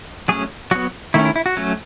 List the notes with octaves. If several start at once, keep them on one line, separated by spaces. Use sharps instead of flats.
F#3 A3 C#4 G#4
F#3 B3 F#4
D#3 A3 C#4 E4
E4
E4
F#4
F#3 A3 C#4